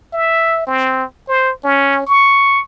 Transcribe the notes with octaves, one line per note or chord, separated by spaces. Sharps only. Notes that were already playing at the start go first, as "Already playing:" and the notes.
E5
C4
C5
C#4
C#6